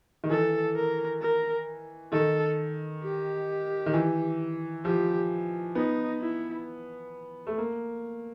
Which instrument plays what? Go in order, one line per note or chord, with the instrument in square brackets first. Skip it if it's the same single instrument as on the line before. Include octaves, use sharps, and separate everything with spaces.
[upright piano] D#3
[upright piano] E3 [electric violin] A4
[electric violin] A#4
A#4
[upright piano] D#3 [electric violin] A4
[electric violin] G4
[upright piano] D#3
E3
[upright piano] F3 [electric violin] G4
[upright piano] B3 [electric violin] D#4
[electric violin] E4
[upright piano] A3
A#3